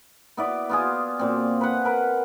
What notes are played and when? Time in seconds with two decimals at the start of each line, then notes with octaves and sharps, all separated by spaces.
0.37 B3 E4 D5
0.69 B3 F4 G#4
1.19 A#2 C4
1.61 B4 F#5
1.85 A#4 B4